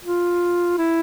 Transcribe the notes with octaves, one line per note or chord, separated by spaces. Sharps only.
F4
E4